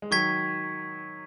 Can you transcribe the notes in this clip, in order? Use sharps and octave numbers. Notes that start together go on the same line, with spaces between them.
G#3
D#3 F#3 C#6 G#6 B6